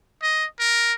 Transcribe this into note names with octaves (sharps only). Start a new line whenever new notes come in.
D#5
A#4